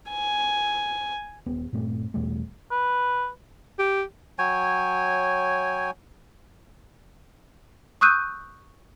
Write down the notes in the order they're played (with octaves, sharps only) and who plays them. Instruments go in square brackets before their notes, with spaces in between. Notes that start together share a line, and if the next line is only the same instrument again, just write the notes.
[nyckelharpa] G#5
[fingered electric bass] D#1 B3
G2 A#2 A3 C4
E2 B2 G3 A3
[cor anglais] B4
[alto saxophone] G4
[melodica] F#3 C#5 G5 G#5
[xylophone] C#6 D#6 E6 F#6 G6 D#7